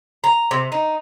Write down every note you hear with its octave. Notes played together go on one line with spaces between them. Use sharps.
A#5
C3
D#4